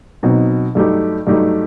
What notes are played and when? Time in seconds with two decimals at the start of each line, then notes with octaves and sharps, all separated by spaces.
0.23 B2 F#3 C4 D#4
0.75 G2 F#3 A3 D#4 G4
1.27 G2 F#3 A3 D#4 G4